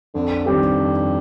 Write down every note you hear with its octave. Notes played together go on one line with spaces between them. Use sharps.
F2 D3
G2 D#3 G3 C4 G4
F2